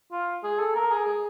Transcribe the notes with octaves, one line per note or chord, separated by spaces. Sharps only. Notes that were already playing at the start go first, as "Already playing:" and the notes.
F4
G#4
A4
A#4
G#4
G#4